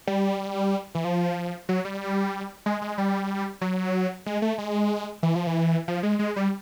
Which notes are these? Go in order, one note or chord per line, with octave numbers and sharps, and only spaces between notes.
G3
E3
F3
F#3
G3
G#3
G#3
G3
F#3
G#3
A3
G#3
E3
F3
E3
F3
G#3
G#3
G3